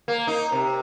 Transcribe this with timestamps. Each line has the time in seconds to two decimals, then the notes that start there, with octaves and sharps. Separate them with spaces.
0.08 A#3
0.27 D#4
0.52 C3